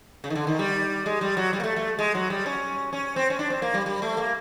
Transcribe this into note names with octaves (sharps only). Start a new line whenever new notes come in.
C#3
D#3
D3
D#3
G3
G#3
G3
F#3
G3
A#3
A3
A3
G#3
F#3
G3
C#4
C#4
C4
C#4
D4
C4
A#3
G3
G3
A3
A#3